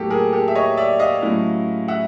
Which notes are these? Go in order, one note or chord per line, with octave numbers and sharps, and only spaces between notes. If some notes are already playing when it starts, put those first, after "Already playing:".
Already playing: A2 F#3 A#3 G4 A4
G#4 A#4
G4 A4
E5
C#5 D#5
D5 E5
D#5 F5
A2 F#3 A3 C#4 E4
E5 F#5